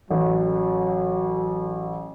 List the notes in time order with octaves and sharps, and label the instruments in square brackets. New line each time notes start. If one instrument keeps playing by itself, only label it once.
[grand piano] A1 [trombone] F#3